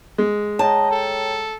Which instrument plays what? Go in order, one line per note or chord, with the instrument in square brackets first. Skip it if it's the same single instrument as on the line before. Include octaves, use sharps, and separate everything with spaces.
[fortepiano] G#3
[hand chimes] C#5 G5 A#5 [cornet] D#5 [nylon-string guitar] A5
[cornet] A4